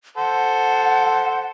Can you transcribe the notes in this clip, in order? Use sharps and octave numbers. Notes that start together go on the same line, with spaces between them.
A4 C5 F#5